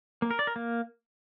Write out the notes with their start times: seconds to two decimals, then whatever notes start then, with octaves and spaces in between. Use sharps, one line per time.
0.22 A#3
0.31 A#4
0.39 D5
0.47 A#4
0.56 A#3